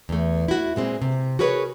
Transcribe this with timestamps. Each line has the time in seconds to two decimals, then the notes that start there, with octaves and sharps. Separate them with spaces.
0.09 E2 A3
0.48 E4 F#4
0.76 A#2 G#3 C4
1.02 C3
1.39 F#4 G#4 A#4 B4 C#5